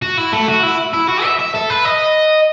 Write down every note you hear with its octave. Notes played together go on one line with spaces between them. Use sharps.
F#4
E4
A3
F#4
E4
E4
F#4
E5
E5
A4
B4
D#5